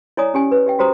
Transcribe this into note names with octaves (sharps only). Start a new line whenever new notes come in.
E4 C#5 D5 G#5 A#5 D#6
C#4 G4 G#5
B4
G4 E5 G5
F#4 G4 C5 A#5 D#6